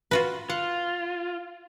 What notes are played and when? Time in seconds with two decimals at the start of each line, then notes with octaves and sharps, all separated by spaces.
0.11 F4 F#4 B4
0.50 F4 F#5